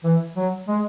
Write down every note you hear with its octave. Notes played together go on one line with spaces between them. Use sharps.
E3
F#3
G#3